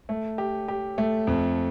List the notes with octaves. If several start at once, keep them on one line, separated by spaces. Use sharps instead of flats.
A3
G4
G4
A3
F2